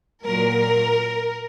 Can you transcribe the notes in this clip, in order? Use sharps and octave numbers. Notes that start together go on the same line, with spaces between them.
A#2 F#3 A#4